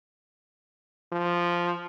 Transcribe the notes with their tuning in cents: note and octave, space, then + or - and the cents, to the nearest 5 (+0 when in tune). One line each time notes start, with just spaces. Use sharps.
F3 -5